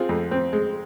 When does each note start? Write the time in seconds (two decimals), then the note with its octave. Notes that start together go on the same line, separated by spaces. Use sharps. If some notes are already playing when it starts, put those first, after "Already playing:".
Already playing: C4 F4 G#4
0.09 F2
0.31 C4
0.53 G#3